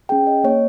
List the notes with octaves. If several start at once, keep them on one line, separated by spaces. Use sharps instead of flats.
C#4 G#4 G5
D#5
A#3 C#5